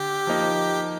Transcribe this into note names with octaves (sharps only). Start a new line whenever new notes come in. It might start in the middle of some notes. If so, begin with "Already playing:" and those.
Already playing: D3 G4
F3 A#3 D#4